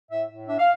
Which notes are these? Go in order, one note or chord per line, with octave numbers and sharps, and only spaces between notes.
A2 E5
A2
D4 E5
F5